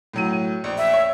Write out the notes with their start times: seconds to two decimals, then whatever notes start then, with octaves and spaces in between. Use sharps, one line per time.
0.13 A2 F#3 D#7
0.64 A#1
0.78 E5
0.93 C#5